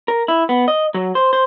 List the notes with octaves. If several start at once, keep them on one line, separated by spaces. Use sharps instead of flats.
A#4
E4
B3
D#5
F#3
C5
C5